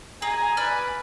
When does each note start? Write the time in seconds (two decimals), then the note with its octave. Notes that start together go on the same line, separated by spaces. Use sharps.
0.22 G#4 G#5 A#5
0.57 B4 D5 E6 F6